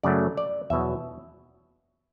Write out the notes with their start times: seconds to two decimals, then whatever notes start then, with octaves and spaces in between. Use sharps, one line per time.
0.03 F#2 C#3 F#3 A3 D5
0.37 D5
0.70 E2 B2 F#3 E5